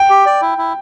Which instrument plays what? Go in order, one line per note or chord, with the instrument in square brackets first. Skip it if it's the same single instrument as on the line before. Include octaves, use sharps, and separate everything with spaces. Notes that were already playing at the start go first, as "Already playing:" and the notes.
Already playing: [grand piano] G5
[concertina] G4
D5
E4
E4